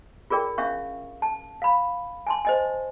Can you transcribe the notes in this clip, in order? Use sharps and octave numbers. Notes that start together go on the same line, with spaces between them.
F4 G#4 A#4 D5 G5
C#4 D4 E5 F5 C#6
A5
F5 B5
G#5 A5 C6
C5 D#5 G#5